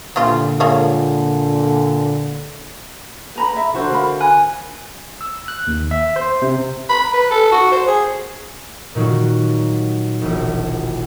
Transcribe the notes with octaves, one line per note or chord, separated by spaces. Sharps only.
A#2 D3 E3 G3 F4
G#3 A#3 C#5
B4 A#5 B5
E5 A#5
D3 F#4 C5
A#4 F5 B5
G#5 F#6
E6
F#6
D#2
E5
C5
C3
B5
B4
A4
F#4
C5
G#4
A#2 D#3 F#3 G3 F#4
E1 A#1